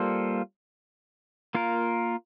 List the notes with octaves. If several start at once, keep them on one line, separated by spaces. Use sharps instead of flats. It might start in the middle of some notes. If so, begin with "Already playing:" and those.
Already playing: G3 A#3 F4 A4 C5
A#3 F4 A#4